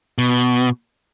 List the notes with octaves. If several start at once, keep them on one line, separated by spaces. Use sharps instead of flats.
B2